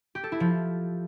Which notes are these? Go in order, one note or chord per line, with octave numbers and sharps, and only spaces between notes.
G4
A4
E4
F3